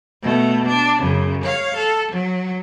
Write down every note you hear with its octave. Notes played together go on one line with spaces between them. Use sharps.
B2 A3
D4
F#2 C#3
C#5 F5
A4
F#3